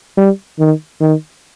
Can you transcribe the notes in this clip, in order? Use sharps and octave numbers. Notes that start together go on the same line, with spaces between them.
G3
D#3
D#3